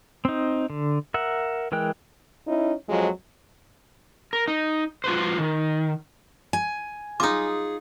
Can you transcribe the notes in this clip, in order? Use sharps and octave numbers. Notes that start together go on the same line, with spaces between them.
C4 D#4
D3
A#4 E5 F#5
E3 G#3 A#4 G5 F#6
C#4 D#4 E4
F2 F3 F#3 G#3
A#4
D#4
F4 F#4 B4 C5
D#3
G#5
D#4 F4 G#4 D6 D#6